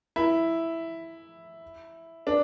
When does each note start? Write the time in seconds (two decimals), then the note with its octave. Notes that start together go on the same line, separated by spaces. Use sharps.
0.16 E4
2.27 D4